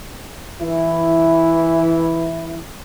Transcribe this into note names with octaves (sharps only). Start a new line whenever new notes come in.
E3 E4